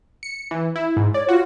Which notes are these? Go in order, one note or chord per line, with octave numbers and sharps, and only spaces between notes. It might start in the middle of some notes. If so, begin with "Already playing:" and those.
C#7
E3
E4
G#2
C#5 D5
F4 F#4